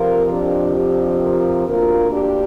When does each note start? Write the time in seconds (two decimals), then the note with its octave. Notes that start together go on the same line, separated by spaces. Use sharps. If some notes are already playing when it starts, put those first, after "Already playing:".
Already playing: F2 C3 F3 F4 A#4
0.30 D4 G4
0.75 D4 G4
1.21 F4 A#4
1.66 D2 D3 A#3 F4 A#4
2.12 D4 G4